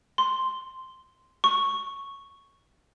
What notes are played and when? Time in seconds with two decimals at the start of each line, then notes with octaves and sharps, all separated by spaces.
0.18 C6
1.44 C#6